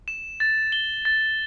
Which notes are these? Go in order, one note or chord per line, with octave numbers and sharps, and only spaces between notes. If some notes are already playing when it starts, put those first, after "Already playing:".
E7
A6
G7
A6